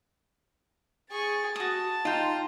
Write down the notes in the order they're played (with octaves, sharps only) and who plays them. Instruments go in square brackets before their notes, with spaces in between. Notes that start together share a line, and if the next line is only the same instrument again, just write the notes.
[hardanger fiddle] G#4 C#6 [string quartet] A6
[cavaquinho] F#4 D#6 [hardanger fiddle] A5
[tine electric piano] D#4 [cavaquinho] F4 G5 [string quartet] A#5 C6 F6